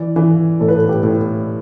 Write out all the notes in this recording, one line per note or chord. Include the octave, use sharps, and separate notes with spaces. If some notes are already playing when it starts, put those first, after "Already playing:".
Already playing: E3 D5
E3
A2 A4
B4
A4
G4
A2
A4